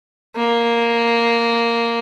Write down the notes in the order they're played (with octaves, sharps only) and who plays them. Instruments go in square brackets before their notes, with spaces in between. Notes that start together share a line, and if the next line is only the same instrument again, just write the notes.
[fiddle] A#3